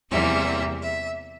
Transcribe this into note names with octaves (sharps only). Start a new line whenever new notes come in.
E2 C3 E3 G3 A#3 E5
E5